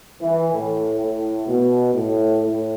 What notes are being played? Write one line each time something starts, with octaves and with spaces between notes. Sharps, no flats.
E3
A2
A2
B2
A2
A2